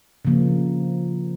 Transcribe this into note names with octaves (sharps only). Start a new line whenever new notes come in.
C#3 F3 A#3